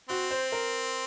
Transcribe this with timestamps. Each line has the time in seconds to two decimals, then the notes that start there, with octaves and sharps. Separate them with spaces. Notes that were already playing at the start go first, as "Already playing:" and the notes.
0.09 C4 F#4
0.31 C5
0.52 A#4